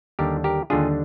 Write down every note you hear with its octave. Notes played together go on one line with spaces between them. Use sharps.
D#2 D3 G3 D4 G4 A#4
G4 A#4
D#2 D3 G3 D4 F4 G#4